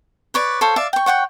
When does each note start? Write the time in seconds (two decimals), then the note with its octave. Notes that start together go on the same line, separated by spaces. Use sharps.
0.34 B4 C#5 D5
0.61 A4 C5 C#5 F5
0.76 D5 E5 F5
0.93 G5 C#6
1.06 C#5 F#5 G5 C#6